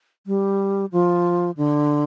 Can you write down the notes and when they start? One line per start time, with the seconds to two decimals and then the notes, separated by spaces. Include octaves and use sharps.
0.27 G3
0.92 F3
1.57 D3